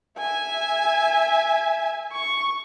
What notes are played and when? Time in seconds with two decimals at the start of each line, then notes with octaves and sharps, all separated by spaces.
0.18 E5 G#5
2.12 C#6